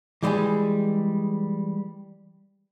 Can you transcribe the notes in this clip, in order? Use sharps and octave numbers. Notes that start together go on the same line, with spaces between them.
E3 G3 G#3 G4 G#4